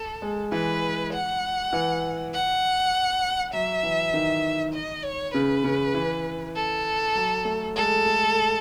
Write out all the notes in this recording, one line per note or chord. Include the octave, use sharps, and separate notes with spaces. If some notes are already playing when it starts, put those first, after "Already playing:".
Already playing: A4
G#3
E3 B4
F#5
E3
F#5
F#3 E5
E3
D#3
D#5
C#5
C#3 B4
C#3
E3
A4
F#3
A3
G#3 A4
A3